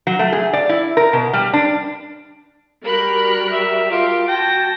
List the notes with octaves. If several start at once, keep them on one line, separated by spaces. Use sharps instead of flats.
F#3
A3
G#4
D5
E4
A#4
B2
G3
D4
G3 F#4 A#4 B5 F#6
E5
F4 G4
F#4 G5 A5 A#6